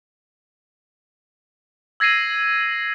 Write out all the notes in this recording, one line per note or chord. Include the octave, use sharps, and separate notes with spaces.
E6 G#6 A#6 C7 D#7 F#7